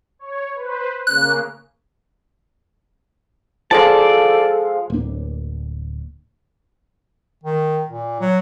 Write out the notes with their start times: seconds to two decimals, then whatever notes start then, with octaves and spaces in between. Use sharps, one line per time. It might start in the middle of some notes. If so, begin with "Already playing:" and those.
0.19 C#5
0.55 B4 C5
1.07 C#3 A#3 F#6
3.71 F3 G#3 A4 D5 F5 A5
4.90 D1 A#3 D4
7.44 D#3
7.88 A#2
8.21 F#3